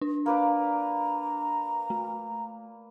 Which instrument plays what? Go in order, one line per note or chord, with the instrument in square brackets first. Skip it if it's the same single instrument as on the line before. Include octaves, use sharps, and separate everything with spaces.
[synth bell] D4
[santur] A#3 B4 D5 [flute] A#5
[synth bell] A3